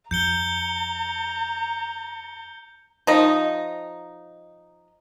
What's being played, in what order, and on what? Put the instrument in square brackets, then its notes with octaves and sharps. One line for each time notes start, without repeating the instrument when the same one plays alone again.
[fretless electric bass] F2 [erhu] A#5 [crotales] G6 C#7 G7
[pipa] F3 D#4